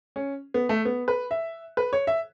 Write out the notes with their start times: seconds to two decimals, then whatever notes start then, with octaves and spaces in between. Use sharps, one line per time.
0.16 C#4
0.54 B3
0.69 A3
0.85 B3
1.08 B4
1.31 E5
1.77 B4
1.93 C#5
2.07 E5